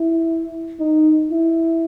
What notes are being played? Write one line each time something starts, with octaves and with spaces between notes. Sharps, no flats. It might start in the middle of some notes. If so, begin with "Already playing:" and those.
Already playing: E4
D#4
E4